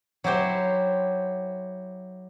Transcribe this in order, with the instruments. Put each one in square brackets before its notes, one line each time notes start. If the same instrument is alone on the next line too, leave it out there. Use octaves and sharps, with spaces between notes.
[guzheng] F#3 E4 G4 C5